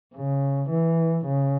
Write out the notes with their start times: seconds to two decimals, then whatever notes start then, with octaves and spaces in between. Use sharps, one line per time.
0.15 C#3
0.70 E3
1.25 C#3